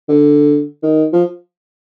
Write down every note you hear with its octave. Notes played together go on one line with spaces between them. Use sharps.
D3
D#3
F3